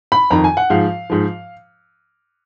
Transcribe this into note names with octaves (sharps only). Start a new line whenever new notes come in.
B5
F2 D#3 A#5
G#5
F#5
G#2 F3 F5
G#2 F3